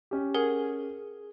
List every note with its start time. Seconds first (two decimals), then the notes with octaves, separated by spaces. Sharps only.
0.11 C#4 G4
0.35 G#4 A#4 F#5